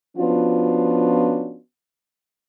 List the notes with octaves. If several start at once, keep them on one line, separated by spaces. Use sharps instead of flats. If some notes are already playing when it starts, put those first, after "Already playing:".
F3 B3 C#4 D4 F4 F#4